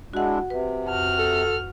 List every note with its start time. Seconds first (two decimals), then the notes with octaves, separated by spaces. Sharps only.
0.14 G#3 D4 E4 F#4 F#5
0.50 C3 B4
0.87 F2 F#4 F6
1.19 A4